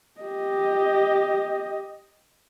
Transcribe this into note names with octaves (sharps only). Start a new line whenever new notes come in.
G4 D#5